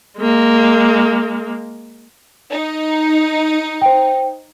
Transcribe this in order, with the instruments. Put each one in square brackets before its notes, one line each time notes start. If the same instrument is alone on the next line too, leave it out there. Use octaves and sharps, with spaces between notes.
[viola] G#3 A#3
[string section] D#4
[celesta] C5 G5